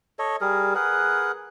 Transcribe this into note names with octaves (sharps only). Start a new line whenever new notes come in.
A4 C#5 D#5
G3 G#4 A#4
G#4 A#4 B4 F#5